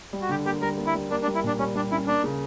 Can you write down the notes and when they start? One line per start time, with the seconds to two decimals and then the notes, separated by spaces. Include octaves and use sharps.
0.13 G3
0.22 F#4
0.29 D3 G4
0.46 A#3 G4
0.61 G3 A#4
0.78 A#3
0.87 E4
0.95 G3
1.11 A#3 D4
1.22 D4
1.27 G3
1.35 E4
1.43 A#2 D4
1.59 G3 C#4
1.75 G3 D4
1.91 C#4 E4
2.07 A#3 D4
2.24 C#3